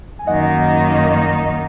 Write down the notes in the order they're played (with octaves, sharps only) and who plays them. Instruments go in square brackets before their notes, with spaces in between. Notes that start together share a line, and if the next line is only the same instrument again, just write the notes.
[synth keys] G#5
[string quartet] F#2 D#3 A#3 D#4 [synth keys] D#5 F#5